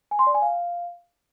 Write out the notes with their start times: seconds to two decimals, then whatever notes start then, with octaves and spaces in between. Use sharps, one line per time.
0.11 G#5
0.19 C6
0.27 D5
0.34 G#5
0.42 F5